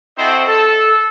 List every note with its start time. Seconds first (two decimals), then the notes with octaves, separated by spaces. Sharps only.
0.18 C4 E4 F#4 A4 C5 D#5
0.47 A4